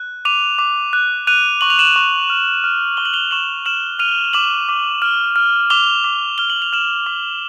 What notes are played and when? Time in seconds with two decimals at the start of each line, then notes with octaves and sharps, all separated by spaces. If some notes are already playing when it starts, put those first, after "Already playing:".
Already playing: F#6
0.25 D6 D#7 F7
0.59 D6
0.93 F#6
1.27 F#6 D#7 F7
1.61 C#6 F#7
1.70 F7
1.79 E7 F#7
1.96 C#6
2.30 F6
2.64 F6
2.97 C#6 G7
3.05 F#7
3.13 F7 G7
3.31 C#6 E7 F#7
3.66 F6 E7 F#7
3.99 F6 D#7 F7
4.33 D6 E7 F#7
4.69 D6
5.02 F6
5.36 F6
5.70 D6 F7 G7
6.04 D6
6.38 F6 G7
6.50 F#7
6.62 F7
6.73 F6 E7 F#7
7.06 D6